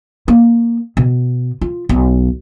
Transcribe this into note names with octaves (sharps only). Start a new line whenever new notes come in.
A#3
B2
F4
B1